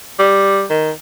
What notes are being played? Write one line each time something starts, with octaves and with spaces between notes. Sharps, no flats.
G3
D#3